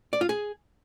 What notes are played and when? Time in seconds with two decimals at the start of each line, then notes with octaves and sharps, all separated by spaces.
0.13 D5
0.21 F4
0.29 G#4